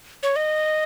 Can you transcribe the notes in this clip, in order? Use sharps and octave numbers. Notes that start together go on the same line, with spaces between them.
C#5
D#5